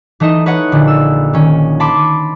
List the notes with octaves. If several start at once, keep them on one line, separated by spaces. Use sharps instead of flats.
E3 A3 D#4 D#5 E7
B4 C#5 D#5 F#5
A#1 D3
E6
D#3 C#4
A5 B5 C6 D6